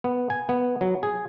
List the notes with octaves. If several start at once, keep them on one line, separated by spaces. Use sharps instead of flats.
B3
G#5
B3
F#3
G#4